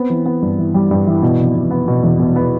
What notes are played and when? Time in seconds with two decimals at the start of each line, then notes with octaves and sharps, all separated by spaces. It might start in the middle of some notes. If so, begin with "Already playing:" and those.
Already playing: B3 C4
0.10 E3
0.26 B3
0.42 G2
0.58 E3
0.74 G3
0.91 G2
1.07 E3
1.22 B2
1.39 F1
1.55 B2
1.71 B3
1.88 B2
2.03 E2
2.20 B2
2.36 B3